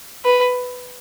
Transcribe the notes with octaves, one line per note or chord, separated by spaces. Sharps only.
B4